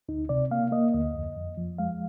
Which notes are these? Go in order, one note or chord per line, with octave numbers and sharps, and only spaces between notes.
D2 D#4
C3 D5
A#3 F5
A#3 D#5
D2 D#5
F2
F2
F3
G#3 F5